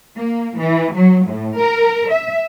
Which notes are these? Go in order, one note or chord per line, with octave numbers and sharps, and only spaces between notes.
A#3
E3
F#3
A2
A#4
E5